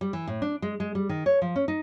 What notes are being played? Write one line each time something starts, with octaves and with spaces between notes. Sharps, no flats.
G3
E3
A2
D4
G#3
G#3
G3
D#3
C#5
F3
C#4
D#4